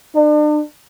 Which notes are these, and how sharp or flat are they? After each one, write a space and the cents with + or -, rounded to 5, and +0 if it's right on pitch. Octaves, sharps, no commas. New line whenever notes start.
D4 +40